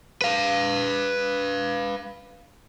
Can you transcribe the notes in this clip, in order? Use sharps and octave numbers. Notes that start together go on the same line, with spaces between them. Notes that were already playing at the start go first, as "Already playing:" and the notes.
B4 F5